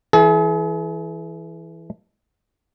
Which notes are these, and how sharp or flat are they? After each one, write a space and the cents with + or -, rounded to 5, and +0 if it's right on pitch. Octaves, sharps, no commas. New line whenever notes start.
E3 +0 G#4 +45